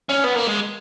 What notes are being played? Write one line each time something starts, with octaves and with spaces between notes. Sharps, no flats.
C#4
B3
A#3
G#3